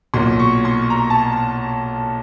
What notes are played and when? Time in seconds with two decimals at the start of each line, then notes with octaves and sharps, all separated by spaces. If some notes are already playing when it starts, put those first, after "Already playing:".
0.14 B1 A#2 F#3 C6
0.40 C#6
0.65 C6
0.90 A#5
1.10 A5